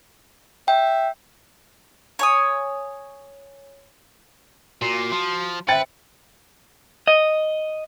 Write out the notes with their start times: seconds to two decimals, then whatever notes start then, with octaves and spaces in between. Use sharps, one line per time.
0.68 E5 G5
2.19 C#5 G#5 D#6
4.82 A#2 F#4 C7
5.12 F3
5.68 B4 C5 E5 G5 A6 C#7
7.07 D#5